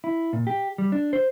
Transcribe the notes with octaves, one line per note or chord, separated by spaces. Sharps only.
E4
A#2
G4
G3
D4
C5